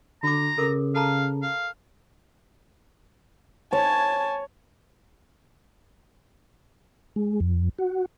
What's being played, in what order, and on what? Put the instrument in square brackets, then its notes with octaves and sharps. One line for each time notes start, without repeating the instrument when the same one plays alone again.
[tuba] D3 [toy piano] F#4 D6 [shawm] A#5
[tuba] C#3 [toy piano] A4 A#4 D6
[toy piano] A4 A5 A#5 [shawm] F5
[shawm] F5
[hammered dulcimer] C#5 [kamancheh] G#5 A5
[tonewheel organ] G#3
F2
F#4